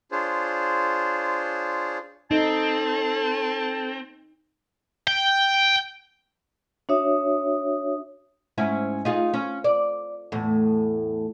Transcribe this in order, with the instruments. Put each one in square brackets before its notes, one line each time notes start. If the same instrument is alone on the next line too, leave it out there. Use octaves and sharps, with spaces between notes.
[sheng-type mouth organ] D4 F4 G#4 C5 C#5
[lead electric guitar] C4 [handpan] D#4 [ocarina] A4 [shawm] A5
[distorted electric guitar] G5
[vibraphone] D4 F#4 C#5 E5 D#6
[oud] G#2 C#4 E4
D#4 F4 G#4
C#4
D5
E2 A2